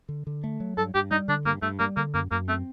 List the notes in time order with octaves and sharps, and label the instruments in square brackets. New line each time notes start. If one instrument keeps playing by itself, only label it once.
[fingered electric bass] D3
D3
A3
F#3
[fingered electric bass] G2 [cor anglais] A4
[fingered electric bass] G2 [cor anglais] G4
[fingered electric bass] G3 [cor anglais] D#4
[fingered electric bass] D3 [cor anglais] D4
[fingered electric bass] G2 [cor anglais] A#3
[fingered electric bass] G2 [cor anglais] A3
[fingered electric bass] G3 [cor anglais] A#3
[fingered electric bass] D3 [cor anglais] A#3
[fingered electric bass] F#2 [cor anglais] A#3
[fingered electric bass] F#2 [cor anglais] A#3
[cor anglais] A3 [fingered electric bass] C4